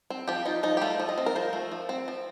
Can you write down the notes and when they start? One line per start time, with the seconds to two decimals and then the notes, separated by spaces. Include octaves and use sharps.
0.10 C4
0.28 F3 G4
0.46 D#4 F4
0.63 F3 D#4
0.77 G4
0.82 A3 F4
1.00 F3
1.09 D#5
1.18 C4
1.26 A#4
1.36 F3 C5
1.53 A3
1.72 F3
1.89 C4
2.08 F3